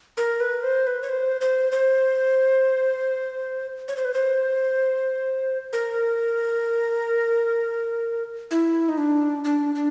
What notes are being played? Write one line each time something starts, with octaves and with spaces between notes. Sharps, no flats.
A#4
B4
C5
B4
C#5
C5
C5
C5
C#5
C5
B4
C5
A#4
E4
D#4
D4
D4
D4